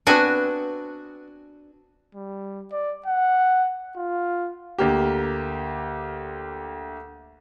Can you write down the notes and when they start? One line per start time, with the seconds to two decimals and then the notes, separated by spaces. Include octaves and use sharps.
0.07 B3 C4 D4 F#4 B4 G#5
2.15 G3
2.72 D5
3.06 F#5
3.96 F4
4.78 D2 A#3 G4